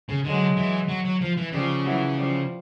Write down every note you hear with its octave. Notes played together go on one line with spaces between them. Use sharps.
C#3
D3 F#3 G#3
E3
F#3
F#3
F3
E3
C#3 F3 G3
E3 F#3
F3 G3